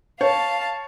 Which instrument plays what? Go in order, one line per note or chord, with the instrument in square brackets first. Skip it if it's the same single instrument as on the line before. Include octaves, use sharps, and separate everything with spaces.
[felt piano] C#5 [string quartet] F5 A5